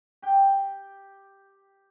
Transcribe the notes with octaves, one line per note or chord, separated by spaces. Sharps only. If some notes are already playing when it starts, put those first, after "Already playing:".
G4 G5